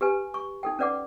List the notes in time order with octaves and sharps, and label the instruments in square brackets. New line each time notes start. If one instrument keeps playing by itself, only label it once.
[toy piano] G4 B4 G#5
C#6
D#4 A4 G5
C#4 B4 D5 F#5 D6